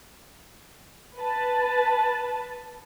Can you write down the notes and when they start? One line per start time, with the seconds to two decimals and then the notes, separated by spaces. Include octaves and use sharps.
1.19 B4 A5